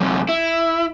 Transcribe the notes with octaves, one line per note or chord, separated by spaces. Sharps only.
F#2 C3
E4